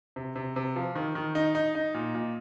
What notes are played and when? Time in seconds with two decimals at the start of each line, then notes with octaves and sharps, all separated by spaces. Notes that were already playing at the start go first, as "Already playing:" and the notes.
0.16 C3
0.36 C3
0.56 C3
0.76 F3
0.95 D#3
1.15 D#3
1.35 D#4
1.55 D#4
1.75 D#4
1.94 A#2
2.15 A#2